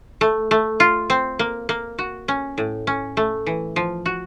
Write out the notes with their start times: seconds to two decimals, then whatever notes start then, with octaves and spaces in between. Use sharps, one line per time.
0.21 A3
0.51 A3
0.80 F4
1.10 C4
1.39 A#3
1.69 A#3
1.99 F#4
2.28 C#4
2.58 A2
2.87 C#4
3.17 A3
3.46 E3
3.76 F3
4.06 F#4